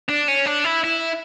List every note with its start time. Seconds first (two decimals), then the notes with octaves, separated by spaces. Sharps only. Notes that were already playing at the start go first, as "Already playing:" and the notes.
0.09 D4
0.28 C#4
0.46 D4
0.64 E4
0.84 E4